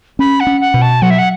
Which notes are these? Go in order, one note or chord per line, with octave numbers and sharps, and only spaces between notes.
C#4 B5
F#5
C#4
F#5
B2
A5
F#3 F#5
E5
F#5